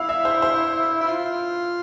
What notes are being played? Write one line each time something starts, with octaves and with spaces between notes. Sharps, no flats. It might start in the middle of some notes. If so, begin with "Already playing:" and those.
Already playing: E4 F5
E5
C5
C5
E4
F4